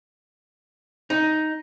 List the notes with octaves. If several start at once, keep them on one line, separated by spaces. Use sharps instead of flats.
D#4